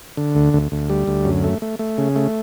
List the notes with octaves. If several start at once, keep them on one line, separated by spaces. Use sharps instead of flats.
D3
D2
D2
D2
G3
D2
F#2
A3
A3
A3
C#3
A3